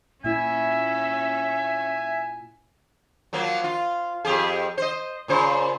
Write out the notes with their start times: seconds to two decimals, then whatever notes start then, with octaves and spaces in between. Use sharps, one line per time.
0.24 A#2 C#4 E4 E5 G#5
3.33 F3 F#3 A#3
3.64 F4
4.25 F2 G4 G#4
4.78 C5 D#5
5.28 A#2 C#3 C5